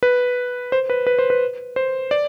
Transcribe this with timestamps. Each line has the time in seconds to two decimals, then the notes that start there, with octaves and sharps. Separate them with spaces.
0.03 B4
0.72 C5
0.90 B4
1.07 B4
1.19 C5
1.30 B4
1.76 C5
2.11 D5